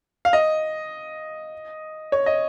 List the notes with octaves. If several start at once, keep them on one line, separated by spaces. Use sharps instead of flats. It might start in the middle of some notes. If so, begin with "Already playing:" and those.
F5
D#5
C#5
D#5